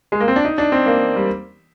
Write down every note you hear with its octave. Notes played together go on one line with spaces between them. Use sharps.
G#3
A#3
C4
D4
D#4
D4
C4
A#3
G3